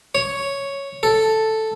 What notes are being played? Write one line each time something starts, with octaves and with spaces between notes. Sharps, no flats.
C#5
A4